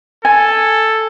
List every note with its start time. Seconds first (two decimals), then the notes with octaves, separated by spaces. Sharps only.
0.25 A4 G#5